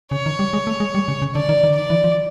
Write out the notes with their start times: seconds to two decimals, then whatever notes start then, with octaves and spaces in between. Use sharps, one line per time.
0.11 C#3 C#5
0.26 D#3
0.39 G3
0.53 G#3
0.67 A3
0.80 G#3
0.95 G3
1.08 C#3
1.22 C#3
1.35 D3 D5
1.49 D#3
1.63 D#3
1.70 D3
1.76 D#3 D5
1.90 E3
2.04 F3